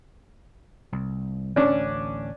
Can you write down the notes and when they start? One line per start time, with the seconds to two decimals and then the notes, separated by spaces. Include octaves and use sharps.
0.92 C2
1.56 A1 D2 C#4 D4